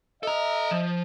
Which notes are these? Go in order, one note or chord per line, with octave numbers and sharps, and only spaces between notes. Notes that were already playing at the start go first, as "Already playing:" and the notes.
A4 D#5 E5 A#5
F3